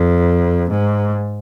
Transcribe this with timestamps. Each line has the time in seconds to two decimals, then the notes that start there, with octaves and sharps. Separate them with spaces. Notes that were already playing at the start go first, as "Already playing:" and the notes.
Already playing: F2
0.71 G#2